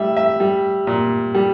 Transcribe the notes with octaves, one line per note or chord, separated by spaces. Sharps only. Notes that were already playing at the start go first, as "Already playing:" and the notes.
Already playing: A2 G3 E5
E5
G3
A#2
G3